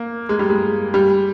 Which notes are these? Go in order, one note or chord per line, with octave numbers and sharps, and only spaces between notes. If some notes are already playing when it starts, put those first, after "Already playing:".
Already playing: A#3
G#3
G3
G#3
G3